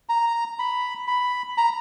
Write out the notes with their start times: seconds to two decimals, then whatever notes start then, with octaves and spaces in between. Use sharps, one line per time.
0.09 A#5
0.59 B5
1.08 B5
1.58 A#5